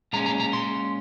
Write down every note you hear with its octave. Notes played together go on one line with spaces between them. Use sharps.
A#2 G#3 C#4 A#5
A#5
A#5
C6